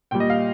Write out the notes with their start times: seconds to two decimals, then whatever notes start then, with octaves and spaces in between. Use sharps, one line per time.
0.11 A#2 G3 G5
0.20 D#5
0.30 F5